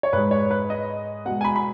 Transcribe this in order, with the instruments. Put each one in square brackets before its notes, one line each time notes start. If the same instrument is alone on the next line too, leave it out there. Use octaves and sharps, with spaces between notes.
[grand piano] C#5
G#2 G#3 B4
C#5
B4
D#5
B2 G#3 F#5
G#5
B5
B5